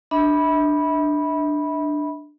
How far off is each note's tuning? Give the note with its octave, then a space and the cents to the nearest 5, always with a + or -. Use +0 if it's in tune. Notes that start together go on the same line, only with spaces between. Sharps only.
D4 +10 E5 -40 B5 -15